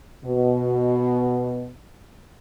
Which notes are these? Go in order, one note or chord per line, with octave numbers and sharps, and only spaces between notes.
B2